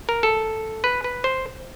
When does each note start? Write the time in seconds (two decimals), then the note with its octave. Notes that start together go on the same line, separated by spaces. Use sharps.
0.09 A#4
0.23 A4
0.84 B4
1.04 B4
1.24 C5